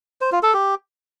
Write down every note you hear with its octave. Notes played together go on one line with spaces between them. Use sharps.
C5
F4
A4
G4